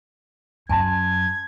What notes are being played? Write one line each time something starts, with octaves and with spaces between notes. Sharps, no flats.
F#2 G#5 A5 C6 G#6